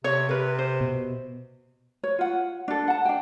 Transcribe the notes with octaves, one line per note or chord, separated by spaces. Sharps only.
C3 C#5
C3 A#4 B4
C5
B2
C#5
F4 F#5
D4 A4
F#5 A5
D4 G5